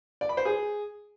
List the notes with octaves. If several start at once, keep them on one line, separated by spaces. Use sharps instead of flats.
D5
B5
C5
G#4